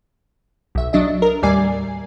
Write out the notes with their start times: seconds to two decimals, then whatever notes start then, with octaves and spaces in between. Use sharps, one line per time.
0.75 B1 E5
0.93 F#3 D4 D#5 E5
1.22 A#4
1.42 D#2 A2 G3 D5 G#5 C7